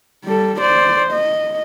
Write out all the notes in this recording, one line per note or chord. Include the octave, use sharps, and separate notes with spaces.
G3 A4
C5 D5
D#5